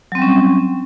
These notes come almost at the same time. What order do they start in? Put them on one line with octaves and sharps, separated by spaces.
F#3 C4 G3 C#4